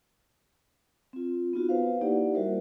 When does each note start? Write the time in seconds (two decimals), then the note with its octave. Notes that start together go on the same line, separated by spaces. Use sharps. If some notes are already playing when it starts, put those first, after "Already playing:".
1.13 C4 F4
1.53 B3 D#4 F4 F#4
1.69 B4 C5 F5
2.01 A#3 D#4 E4 G4 D5 F#5
2.34 G3 F#4 A#4 C5 E5